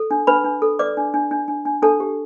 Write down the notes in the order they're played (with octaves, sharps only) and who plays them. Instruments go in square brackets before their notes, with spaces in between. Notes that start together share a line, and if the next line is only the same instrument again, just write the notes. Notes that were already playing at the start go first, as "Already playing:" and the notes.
Already playing: [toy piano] A4
D4
D4 B4 B5
D4
A4
B4 D5 D6
D4
D4
D4
D4
D4
D4 A4 A5
G4